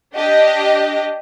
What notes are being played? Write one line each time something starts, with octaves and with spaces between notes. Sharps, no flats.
D4 G4 D#5